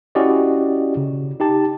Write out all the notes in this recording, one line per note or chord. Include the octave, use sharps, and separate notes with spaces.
C#4 E4 F#4 G4 D5 D#5
C#3
D#4 G4 A5